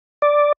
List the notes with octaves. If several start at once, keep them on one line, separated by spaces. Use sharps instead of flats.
D5